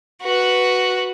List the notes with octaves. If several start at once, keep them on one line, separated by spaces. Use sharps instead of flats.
F#4 B4